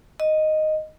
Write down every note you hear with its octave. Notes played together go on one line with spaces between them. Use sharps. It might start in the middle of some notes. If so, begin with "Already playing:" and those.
D#5